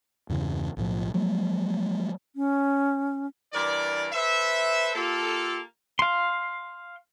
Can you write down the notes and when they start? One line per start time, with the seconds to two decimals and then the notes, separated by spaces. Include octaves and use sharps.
0.29 E2 G2 C#3 E3
0.77 B1 A2 F3
1.14 F3 F#3 G#3 A#3
2.36 C#4
3.53 G2 E3 A#4 D5
4.13 A4 B4 C5 E5
4.95 A#3 F4 G4 A4
5.99 F5 C6